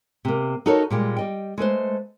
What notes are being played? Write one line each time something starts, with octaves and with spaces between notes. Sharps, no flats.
C3 A#3
D#4 F#4 A4 A#4 C#5
A#2 G3 G#3
G3 D#5 G5
G#3 A3 B4 C5